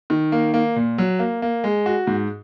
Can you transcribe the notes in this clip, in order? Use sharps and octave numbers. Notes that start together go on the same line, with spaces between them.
D#3
A#3
A#3
A#2
F#3
A#3
A#3
G#3
F#4
G#2